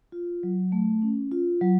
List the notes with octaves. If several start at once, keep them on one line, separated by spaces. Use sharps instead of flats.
F4
F#3
A3
C#4
F4
F#3